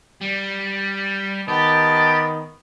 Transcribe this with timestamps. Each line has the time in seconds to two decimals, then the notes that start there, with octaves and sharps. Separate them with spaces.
0.21 G3
1.48 D#3 B3 G4 A5